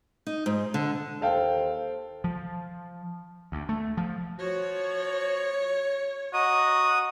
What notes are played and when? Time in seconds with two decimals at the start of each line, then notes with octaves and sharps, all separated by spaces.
0.27 D#4
0.46 G#2
0.74 D3
1.21 D#2 A4 C5 F5 G5
2.24 F3
3.52 D2
3.69 A3
3.97 F3
4.39 F3 F4 F#4 C#5
6.34 F#4 D#5 A#5 D#6